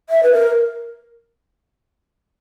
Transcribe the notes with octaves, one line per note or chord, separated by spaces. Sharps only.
E5
B4
A#4